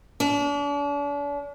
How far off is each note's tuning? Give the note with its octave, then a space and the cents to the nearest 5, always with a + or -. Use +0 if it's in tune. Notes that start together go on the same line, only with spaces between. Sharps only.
D4 -40